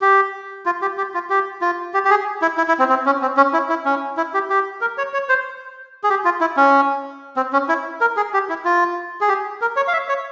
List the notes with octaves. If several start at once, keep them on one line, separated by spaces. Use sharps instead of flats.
G4
F4
G4
G4
F4
G4
F4
G4
G4
G#4
E4
E4
E4
C4
C4
C#4
C4
C#4
E4
E4
C#4
E4
G4
G4
A#4
C#5
C#5
C5
G#4
G4
F4
E4
C#4
C4
C#4
E4
A#4
G#4
G4
E4
F4
G#4
G4
A#4
C#5
F5
E5
C#5